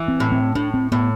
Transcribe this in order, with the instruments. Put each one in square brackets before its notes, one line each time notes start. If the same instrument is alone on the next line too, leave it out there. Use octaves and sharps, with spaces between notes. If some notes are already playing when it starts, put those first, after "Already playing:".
Already playing: [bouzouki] E3
[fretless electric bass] C4
[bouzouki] A2
[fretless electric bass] C4
[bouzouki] A2 [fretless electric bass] D4
[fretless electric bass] C4
[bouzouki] A2 [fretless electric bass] B3